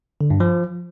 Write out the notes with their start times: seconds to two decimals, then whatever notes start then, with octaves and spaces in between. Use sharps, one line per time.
0.21 D3
0.30 G2
0.40 F3